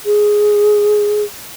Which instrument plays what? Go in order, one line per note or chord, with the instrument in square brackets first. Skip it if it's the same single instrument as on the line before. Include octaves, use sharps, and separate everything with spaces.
[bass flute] G#4